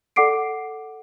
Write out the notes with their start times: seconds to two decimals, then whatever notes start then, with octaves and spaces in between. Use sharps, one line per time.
0.16 A4 D5 F#5 D6 C7 D7